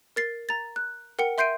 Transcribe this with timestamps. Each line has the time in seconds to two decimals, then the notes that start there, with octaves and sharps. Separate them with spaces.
0.16 A#4 A6 C7
0.49 A#5 A6
0.76 F#6
1.19 A#4 F#5 G5 C#7
1.38 E5 C6 G6 C7 D7 D#7